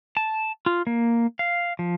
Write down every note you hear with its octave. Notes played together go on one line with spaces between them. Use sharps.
A5
F4
A#3
F5
F3